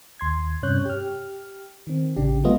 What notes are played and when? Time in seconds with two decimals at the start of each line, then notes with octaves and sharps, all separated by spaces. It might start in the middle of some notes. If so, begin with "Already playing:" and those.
0.19 D#2 C6 G#6
0.63 G2 C3 C#4 C#5 F#6 G6
0.85 G4 F6
1.87 D#3 C4
2.16 A1 C#3 D4 G4
2.43 F#3 G#3 A3 B3 F4 D#5